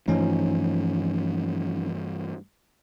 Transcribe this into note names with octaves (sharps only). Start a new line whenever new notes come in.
G2 E3 F3 A3 C#4 D#4